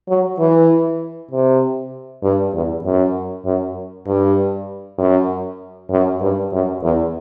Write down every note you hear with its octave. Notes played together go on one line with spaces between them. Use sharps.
F#3
E3
C3
G2
E2
F#2
F#2
G2
F#2
F#2
G2
F#2
E2